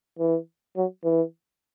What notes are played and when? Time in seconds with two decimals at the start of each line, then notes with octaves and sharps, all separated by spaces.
0.19 E3
0.77 F#3
1.05 E3